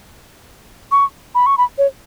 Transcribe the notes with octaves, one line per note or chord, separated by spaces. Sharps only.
C#6
B5
C#6
B5
C#5